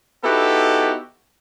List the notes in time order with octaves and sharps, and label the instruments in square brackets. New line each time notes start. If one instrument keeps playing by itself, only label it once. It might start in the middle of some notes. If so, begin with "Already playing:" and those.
[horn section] B3 D#4 E4 F#4 G4 A4